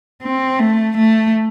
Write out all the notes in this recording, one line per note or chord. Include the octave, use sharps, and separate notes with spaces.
C4
A3
A3